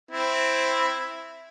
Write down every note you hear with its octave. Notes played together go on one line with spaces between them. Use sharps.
C4 E4